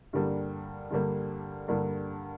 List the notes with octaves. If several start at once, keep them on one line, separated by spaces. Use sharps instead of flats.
G2 D3 G3 A#3
G2 D3 G3 A#3
G2 D3 G3 A#3